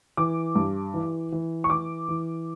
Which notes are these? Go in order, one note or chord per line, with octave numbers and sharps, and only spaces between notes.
E3 D6
G2
E3
E3
C#6
E3 D6
E3